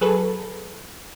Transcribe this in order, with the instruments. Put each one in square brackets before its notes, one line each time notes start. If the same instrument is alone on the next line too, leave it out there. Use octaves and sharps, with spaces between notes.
[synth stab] F#3 G#4 A4 B4